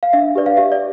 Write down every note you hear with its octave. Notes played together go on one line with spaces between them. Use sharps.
F5
D4 E5
G4 B4 D5
F5
G4 E5
D5